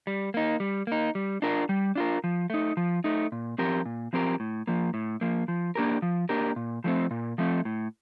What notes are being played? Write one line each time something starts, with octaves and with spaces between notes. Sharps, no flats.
G3
A#3 D#4
G3
A#3 D#4
G3
D4 F4 A#4
G3
D4 F4 A#4
F3
A3 D#4
F3
A3 D#4
A#2
F3 C4 G4 A#4
A#2
F3 C4 G4 A#4
A2
F3 A#3
A2
F3 A#3
F3
A#3 D4 G4 A#4
F3
A#3 D4 G4 A#4
A#2
F3 A3 C4
A#2
F3 A3 C4
A2